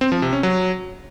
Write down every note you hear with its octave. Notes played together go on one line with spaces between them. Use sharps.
C4
F3
C3
C#4
F#3